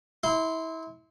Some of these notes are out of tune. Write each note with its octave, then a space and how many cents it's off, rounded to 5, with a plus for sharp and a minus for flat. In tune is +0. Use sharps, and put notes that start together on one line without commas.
E4 -30 C6 -10